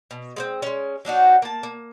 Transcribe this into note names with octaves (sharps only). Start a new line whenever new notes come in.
B2
G#3 A#3 C4
G#3 C#4
F#3 D4 D#4 F#4
A#3 A5
A#3